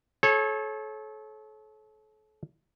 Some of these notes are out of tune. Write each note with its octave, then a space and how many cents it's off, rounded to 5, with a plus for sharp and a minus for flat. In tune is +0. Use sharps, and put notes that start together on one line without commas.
A4 -35 C#5 -25